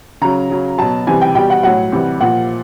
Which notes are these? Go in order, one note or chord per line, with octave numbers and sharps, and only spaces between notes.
C#3 F#3 A#5
C#3 F#3
B2 F#3 A5
C3 E3 G3 G#5
G5
B2 G3 G5
F#5
A2 F#3 F#5
C3 E3 G3
A#2 F3 F#5